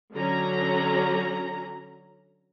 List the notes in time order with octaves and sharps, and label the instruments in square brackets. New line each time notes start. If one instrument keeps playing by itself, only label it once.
[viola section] D3 F#3 C#4 A#5